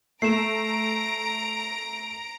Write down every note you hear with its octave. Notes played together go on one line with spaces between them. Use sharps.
A3 A#5 C7 D7 E7